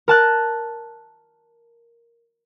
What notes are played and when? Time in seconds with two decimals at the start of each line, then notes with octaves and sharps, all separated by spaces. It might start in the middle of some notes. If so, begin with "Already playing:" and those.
0.08 A#4 A5 F#6